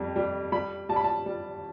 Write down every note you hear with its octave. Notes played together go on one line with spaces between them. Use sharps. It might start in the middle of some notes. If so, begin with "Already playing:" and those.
Already playing: F2 C3 G3
G3
G3 B5
G3 A5
B5
A5
G3